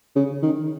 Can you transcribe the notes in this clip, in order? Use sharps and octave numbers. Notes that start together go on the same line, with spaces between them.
C#3
D#3